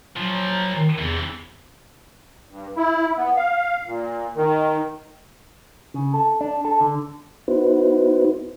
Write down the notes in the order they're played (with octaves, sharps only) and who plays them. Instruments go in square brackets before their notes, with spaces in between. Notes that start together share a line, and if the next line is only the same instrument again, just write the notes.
[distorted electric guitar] A#2 F3 [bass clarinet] F#3
[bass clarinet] D#3
[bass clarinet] E2 [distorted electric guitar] C3 E3
[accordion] G2
E4
B3
F5
A#2
D#3
[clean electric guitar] C#3
A4
D4
A4
D3
[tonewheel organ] B3 D#4 E4 F#4 B4 C5